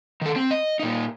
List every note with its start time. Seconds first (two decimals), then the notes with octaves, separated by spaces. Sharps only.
0.21 D#3 A4
0.36 C4
0.51 D#5
0.79 A#2 D#4